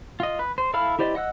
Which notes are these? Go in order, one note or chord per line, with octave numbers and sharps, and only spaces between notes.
F4 D#5
B4
C5
E4 A4 F5 B5 F6
E4 G4 C5 D5 D#5
D#5 F#5 E6 F#6